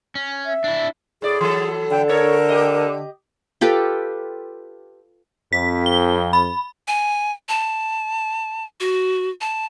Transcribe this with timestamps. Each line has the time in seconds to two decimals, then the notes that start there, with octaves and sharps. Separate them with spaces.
0.15 C#4
0.46 E5
0.64 D4 E4
1.22 A2 G#4 D5
1.41 E3 F#3 A4
1.91 D3 G5
2.09 D4 A4 A#4 C#5
2.49 G4 D#5
3.61 F4 G4 A4 B4
5.53 F2 B6
5.86 G7
6.33 B5
6.88 G#5
7.49 A5
8.80 F#4
9.41 A5